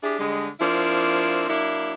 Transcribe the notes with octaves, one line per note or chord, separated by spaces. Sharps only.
D4 E4 G4 G#4
D3 G3 G#3
F3 A#3 C4 D4 E4
F#3 A#3 D4 E4